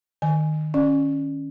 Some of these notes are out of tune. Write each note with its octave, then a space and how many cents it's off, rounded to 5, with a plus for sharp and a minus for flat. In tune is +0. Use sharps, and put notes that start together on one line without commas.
D#3 -15 G#5 +0
C#4 +0 D5 +20